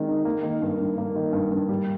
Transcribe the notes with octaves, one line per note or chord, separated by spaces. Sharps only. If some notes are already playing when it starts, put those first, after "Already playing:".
Already playing: D#3 G#3 C4
D#4
A#3
D#3
G2
G2
A#3
D#3
G2
G2
G3